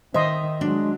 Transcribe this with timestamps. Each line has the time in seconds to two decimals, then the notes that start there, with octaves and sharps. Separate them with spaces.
0.14 D#3 C5 D#5 E5 C6
0.61 F#3 G#3 D4